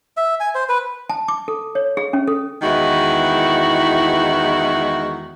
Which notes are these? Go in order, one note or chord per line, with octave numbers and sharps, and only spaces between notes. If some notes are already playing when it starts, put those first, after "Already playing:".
E5
G#5
C5
B4
A5
D6
A4
C#5
G#4
C#4
A4
E2 D#3 G#3 E4 F#4 B4